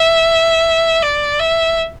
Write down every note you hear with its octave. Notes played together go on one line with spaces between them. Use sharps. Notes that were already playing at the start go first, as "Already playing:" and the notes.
Already playing: E5
D5
E5